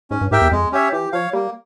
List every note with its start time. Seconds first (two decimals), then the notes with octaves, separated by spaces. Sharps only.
0.11 G#2 C#4
0.21 G2
0.31 G#2 G4 A#4 E5 G5
0.41 E2
0.52 F2 G#3
0.72 C#4 G4 C#5 E5
0.92 E3 G4
1.13 F3 C#5 F5
1.33 G3 A#3